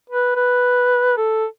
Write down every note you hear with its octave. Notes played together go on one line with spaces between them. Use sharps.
B4
B4
A4